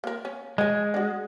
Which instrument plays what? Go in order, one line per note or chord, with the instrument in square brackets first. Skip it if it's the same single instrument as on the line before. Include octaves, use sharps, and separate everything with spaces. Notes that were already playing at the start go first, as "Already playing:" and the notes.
[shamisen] A#3 A#4
C#4
[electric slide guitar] G#3 [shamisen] D#5 G#5
[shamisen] D4 F#4